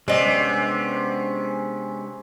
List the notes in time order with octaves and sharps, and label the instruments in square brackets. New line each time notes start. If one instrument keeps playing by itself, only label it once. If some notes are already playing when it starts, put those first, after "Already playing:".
[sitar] C3 [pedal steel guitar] G#3 B3 C#4 [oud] D4 D#5